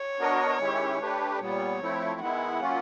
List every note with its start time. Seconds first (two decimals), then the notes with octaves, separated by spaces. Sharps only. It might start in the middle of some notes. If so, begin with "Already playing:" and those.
Already playing: C#5
0.19 B3 D4 F#4 A#4 D#5
0.59 D#3 G#3 C#4 E4 G4
0.99 A3 D4 G4 B4
1.39 A#2 G3 B3 C#5
1.80 F3 A3 C4 E4
2.19 D#3 G#3 B3 E4 F#5
2.60 F#3 A#3 C#4 F4